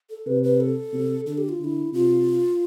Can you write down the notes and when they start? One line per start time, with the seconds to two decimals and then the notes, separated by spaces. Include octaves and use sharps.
0.10 A4
0.27 C3 B4
0.43 B4
0.60 A4
0.93 C3
1.26 D3 A4
1.38 G4
1.49 F4
1.60 D3 F4
1.64 E4
1.93 C3 F4